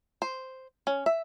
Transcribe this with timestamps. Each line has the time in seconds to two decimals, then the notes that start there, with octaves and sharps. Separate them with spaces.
0.22 C5
0.87 C#4
1.06 E5